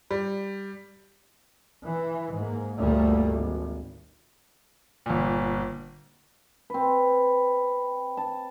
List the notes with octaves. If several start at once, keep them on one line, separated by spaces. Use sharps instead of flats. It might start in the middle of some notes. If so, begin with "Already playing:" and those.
G3
E3
G#2 A#3
G1 D2 A#2 G3 A3 A#3
G#1
G1 A#2
C4 B4
A5